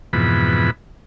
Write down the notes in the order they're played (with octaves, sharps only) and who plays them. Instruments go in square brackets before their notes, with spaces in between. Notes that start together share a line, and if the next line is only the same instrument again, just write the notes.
[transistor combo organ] F2 G#2 B2 E3 B5